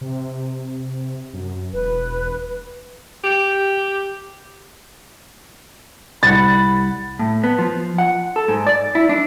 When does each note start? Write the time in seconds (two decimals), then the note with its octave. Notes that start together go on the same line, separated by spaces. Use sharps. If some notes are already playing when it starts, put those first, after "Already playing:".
0.01 C3
1.34 F#2
1.74 E1 B4
3.24 G4
6.23 C2 F#5 B5 A6
7.19 A2
7.44 B3
7.59 F3
7.98 F#5
8.36 A4
8.48 G#2
8.67 D5
8.95 E4
9.09 D4